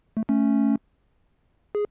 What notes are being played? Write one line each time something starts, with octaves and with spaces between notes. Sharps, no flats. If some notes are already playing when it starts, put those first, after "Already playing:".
A3
A3 C#4
G#4